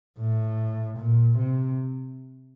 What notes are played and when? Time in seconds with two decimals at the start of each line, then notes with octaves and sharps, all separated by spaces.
0.19 A2
0.98 A#2
1.37 C3